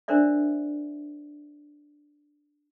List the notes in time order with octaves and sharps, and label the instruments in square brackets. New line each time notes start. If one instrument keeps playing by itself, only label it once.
[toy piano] D4 A#4 C5 D5 E5